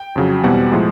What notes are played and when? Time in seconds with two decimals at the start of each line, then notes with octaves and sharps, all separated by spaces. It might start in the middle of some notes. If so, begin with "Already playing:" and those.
Already playing: G5
0.16 F2 C#3 F#3
0.43 E2 B2 G3 C4 F#5
0.72 A2 F3 G#3